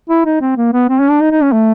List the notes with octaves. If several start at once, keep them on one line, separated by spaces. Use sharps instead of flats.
E4
D#4
C4
A#3
B3
C4
C#4
D4
D#4
D#4
C#4
A3